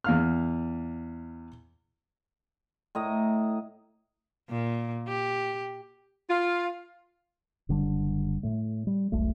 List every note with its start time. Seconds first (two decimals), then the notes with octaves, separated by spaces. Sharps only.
0.04 E2 F5 F6
2.95 A2 D#5 A#5
4.50 A#2
5.08 G4
6.29 F4
7.69 F#1 D3 G3 D4
8.43 A2 A3
8.87 G3
9.12 E1 B1 A3